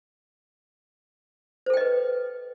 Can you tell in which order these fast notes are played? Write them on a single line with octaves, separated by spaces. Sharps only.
C5 A4 G5 D#5 B4